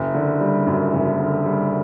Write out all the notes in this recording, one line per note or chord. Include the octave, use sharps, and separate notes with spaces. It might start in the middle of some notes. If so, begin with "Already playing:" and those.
Already playing: F#1
D3
G3
F#2
F#1
D3
G3